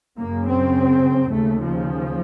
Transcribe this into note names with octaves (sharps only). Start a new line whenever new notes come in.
F#2 C#3 A#3
C4
D#2 C#3 A3
F3